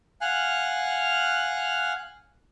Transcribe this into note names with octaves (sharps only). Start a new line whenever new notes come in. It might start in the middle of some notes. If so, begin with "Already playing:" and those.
F5 F#5 G#5 F6 F#6